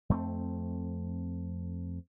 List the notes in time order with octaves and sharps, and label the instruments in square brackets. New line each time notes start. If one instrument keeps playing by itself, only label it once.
[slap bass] F2 A3 C4